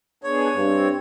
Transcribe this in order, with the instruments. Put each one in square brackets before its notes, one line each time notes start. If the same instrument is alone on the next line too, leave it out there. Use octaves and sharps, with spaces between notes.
[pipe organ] B3 D4 G#4 [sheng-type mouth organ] C#5
[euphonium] G2 [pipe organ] C4